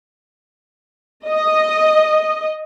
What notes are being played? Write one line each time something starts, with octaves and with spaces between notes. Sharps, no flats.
D#5